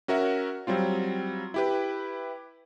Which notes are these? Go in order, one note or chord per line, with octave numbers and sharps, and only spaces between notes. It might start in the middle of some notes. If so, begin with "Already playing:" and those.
C#4 F#4 A#4 E5 F#5
F#3 G3 C4 F4
E4 G4 B4